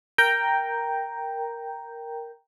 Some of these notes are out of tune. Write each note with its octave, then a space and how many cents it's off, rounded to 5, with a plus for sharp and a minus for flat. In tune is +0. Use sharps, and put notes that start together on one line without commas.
A#4 +0 G5 +0 A#5 +0